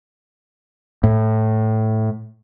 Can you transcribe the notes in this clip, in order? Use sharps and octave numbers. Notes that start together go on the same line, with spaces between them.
A2